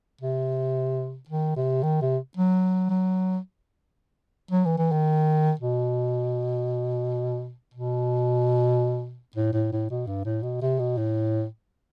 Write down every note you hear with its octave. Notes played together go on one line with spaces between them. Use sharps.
C3
D#3
C3
D#3
C3
F#3
F#3
F#3
E3
E3
D#3
B2
B2
A2
A2
A2
B2
G2
A2
B2
C3
B2
A2